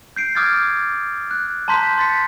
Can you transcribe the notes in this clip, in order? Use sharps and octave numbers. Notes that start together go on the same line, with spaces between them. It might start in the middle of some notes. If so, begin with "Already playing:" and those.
G6 C7 D7
D6 D#6 F6 G#6 A6
F#6
A5 A#5 C6 G6 B6
C6 A6 B6 C#7